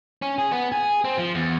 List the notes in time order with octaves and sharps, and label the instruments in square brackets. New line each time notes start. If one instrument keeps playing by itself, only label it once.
[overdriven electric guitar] C#4
G#4
B3
G#4
C4
F3
E2